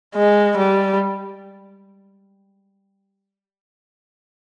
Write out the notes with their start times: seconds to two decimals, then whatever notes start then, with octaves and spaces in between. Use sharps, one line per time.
0.15 G#3
0.57 G3